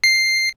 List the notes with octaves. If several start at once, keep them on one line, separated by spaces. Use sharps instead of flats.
C7